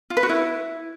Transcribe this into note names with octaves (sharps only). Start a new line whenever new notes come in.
F4
B4
F#4
E4